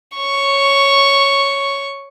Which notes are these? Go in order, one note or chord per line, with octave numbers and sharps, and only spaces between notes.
C#5 C#6